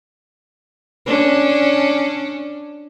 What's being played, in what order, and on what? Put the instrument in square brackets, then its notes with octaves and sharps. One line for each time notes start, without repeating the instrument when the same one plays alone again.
[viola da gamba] C#4 D4